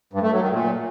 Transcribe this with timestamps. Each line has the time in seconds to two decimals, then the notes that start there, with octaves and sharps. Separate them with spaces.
0.13 G2
0.22 A3
0.32 F#3
0.41 D#3
0.50 A#2